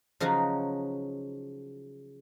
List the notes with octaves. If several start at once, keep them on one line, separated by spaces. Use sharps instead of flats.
C#3 F3 F#3 D#4 F#4